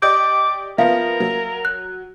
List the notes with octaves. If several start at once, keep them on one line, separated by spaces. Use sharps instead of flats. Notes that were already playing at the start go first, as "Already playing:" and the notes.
G4 D5 D#5 D6 G6
F3 B3 A#4 E5 F5
F#3
F#6